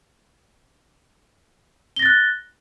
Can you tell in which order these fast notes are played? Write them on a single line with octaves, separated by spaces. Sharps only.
G7 A#6 A6 F#6